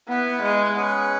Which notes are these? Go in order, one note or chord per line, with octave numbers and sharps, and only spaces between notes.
B3 E4 B4 F#5
G#3
C#4 G#4 B4 F#5